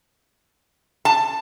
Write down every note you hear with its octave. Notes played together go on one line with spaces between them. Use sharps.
A5